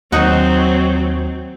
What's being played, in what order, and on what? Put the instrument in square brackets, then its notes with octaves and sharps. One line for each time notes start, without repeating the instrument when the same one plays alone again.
[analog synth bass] D#2 [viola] F#3 C4 [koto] D#4 F#4